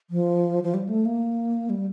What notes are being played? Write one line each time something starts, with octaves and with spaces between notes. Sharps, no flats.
F3
F3
G3
A3
A#3
G3